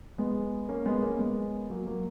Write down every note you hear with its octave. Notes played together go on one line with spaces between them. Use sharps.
G#3 B3
A#3 C#4
G#3 B3
A#3 C#4
G#3 B3
F#3 A#3
F#3 A#3